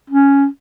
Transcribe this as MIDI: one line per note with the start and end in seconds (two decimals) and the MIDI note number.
0.10 0.46 61